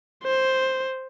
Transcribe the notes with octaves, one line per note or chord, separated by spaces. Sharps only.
C5